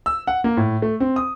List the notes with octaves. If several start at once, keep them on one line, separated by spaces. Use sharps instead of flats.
E6
F#5
A#3
A2
A3
C4
D#6